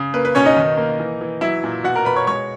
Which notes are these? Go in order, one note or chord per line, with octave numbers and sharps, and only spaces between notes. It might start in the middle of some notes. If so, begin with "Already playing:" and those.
Already playing: C#3
A#3 B4
B4
B2 C#4 C#5
D#4 D#5
D#3
A#3
E3
E3
F#3 E4 E5
A#2
B2 F#4 F#5
A#4 A#5
B2 B4 B5
C#5 C#6
G#3 C#5 C#6